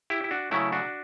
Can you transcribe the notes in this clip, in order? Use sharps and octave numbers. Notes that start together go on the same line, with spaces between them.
E4 G4
E4
D4 F#4
C#3 F#3 A3 C#4 E4
D4 F#4